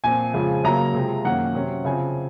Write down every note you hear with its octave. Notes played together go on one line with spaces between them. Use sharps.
A#2 F3 C4 G#5
F2 C#3 F3 G#3
C#3 F#3 A#3 A#5
C3 F3 G#3 C4
F#2 D#3 A#3 C#4 F#5
C3 F#3 C#4
C#3 F3 C4 G#5